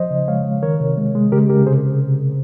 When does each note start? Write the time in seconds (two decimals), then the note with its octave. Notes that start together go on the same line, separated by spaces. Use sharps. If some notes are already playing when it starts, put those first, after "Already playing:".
Already playing: F3 C5 D#5
0.10 C#3
0.28 G#3 C#5 F5
0.45 G#3
0.63 D#3 A#4 C#5
0.80 C3
0.97 G#3
1.15 G#3
1.32 C#3 G4 A#4
1.49 C#3 G4 A#4
1.66 C3 G#4 C5